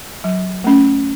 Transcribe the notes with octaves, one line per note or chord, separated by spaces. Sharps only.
F#3
A3 C#4